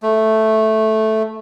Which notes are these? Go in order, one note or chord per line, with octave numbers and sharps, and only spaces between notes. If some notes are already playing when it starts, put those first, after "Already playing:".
A3